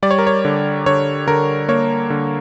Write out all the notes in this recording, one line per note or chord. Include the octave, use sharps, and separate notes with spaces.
G3 D5
C#5
A#4
C#5
D3
D3 C#5
D3 A#4
A#3 C#5
D3